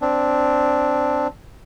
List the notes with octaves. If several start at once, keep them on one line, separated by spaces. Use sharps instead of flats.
C4 D4